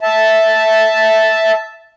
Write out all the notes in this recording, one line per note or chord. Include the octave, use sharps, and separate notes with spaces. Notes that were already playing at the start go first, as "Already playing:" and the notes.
E5 A5